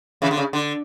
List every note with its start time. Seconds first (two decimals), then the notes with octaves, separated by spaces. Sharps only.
0.22 C#3 E3
0.31 D3
0.37 C#3
0.53 D3